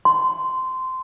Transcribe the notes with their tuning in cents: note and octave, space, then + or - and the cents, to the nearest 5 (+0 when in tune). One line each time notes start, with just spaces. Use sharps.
C6 -15